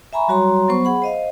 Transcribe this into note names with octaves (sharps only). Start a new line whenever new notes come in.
E5 G#5 A#5 B5 C#6
F#3 G3 F#4 C#5 A#5 C6
F#3 B3 C5 C#6
G#4 F#5 B5
C5 D#5 F5